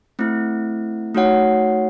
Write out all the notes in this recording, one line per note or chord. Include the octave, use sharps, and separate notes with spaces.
A3 C4 E4
A3 D#4 F#4 C#5 F#5